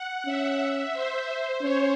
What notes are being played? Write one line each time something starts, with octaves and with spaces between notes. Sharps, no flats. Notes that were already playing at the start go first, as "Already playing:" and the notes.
Already playing: F#5
C#4 E5
C5
C#4 C#5